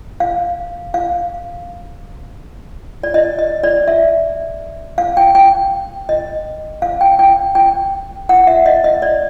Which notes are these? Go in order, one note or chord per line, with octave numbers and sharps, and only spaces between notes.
F5
F5
D5
D#5
D#5
D5
E5
F5
G5
G5
D#5
F5
G5
G5
G5
F#5
E5
D#5
D#5
D5